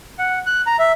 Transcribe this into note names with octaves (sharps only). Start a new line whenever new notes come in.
F#5
F#6
A#5
E5